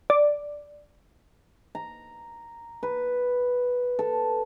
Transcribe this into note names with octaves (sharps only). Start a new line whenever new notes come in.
D5
A#5
B4
A4